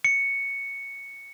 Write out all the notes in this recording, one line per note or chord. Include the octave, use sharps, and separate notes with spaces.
C#7